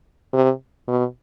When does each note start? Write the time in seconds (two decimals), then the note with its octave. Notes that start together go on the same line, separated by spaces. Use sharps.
0.34 C3
0.88 B2